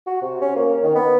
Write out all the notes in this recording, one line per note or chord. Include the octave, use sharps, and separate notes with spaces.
F#4
C3
C#4
A#3
D#3
B3